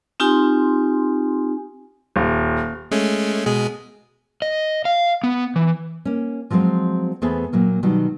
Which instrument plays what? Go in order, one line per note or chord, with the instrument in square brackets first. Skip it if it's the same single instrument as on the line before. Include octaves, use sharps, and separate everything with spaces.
[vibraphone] C4 D#4 F4 G4 G#5 C6
[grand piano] D#1
[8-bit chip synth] G#3 A3 C#4
B2 G#3 G#4
[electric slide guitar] D#5
F5
B3
E3
[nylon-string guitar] A#3 C#4
F3 F#3 G#3 C4 C5 F5
E2 A3 B3 G#4 A4 C5
A#2 F#3 A#3
B2 D#3 F#3 G3